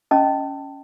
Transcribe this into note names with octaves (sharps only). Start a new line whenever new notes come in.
C#4 D#5 A5